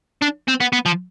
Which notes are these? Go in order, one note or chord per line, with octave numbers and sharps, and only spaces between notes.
D4
C4
B3
B3
F3